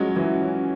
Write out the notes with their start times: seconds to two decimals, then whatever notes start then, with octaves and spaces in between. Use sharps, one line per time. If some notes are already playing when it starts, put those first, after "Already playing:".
Already playing: F3 F#3 G#3 C#4
0.16 E3 F#3